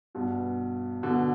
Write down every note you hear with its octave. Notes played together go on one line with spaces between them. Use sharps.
G2 B2
B2 D3